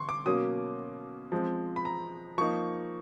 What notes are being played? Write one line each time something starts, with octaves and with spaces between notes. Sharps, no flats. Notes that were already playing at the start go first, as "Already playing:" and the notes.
Already playing: D3 C6 C#6
D6
B2 F#3 A#3 C#4 D#6
F3 G#3 C4
B5
A#5
F3 A#3 D#4 C#6